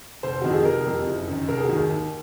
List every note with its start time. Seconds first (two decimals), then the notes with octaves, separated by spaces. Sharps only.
0.23 F1 C5
0.41 F2 C3 D#3 F#4
0.54 G#4
0.65 F1 A#4
0.86 F2 C3
1.07 F#1
1.27 F#2 D#3
1.48 F1 A#4
1.57 G#4
1.65 F#4
1.69 D#2 D#3 G#4
1.89 D#2